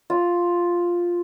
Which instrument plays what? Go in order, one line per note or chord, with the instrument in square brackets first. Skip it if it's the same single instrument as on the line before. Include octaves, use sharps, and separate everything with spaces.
[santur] F4